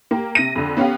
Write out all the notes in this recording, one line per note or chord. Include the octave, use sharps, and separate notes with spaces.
A#3 G4
C3 A#6 D#7
F2 D3
B3 C#4 G4 F5